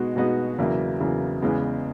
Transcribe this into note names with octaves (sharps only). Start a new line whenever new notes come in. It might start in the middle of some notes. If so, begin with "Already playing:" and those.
Already playing: B2 G#3 B3 D#4 F#4
B2 G#3 B3 D#4 F#4
E2 C#3 F#3 A#3 E4
E2 C#3 F#3 A#3 E4
E2 C#3 E3 G#3 B3